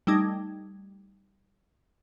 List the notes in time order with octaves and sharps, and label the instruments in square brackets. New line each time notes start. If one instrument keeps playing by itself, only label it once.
[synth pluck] G3 A3 D#4 G#6